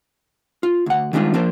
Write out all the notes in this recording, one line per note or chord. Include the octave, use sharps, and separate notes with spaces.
F4
D2 F#5
D#3 G3 G#3 D4 F4
F3 A#3 D4 C5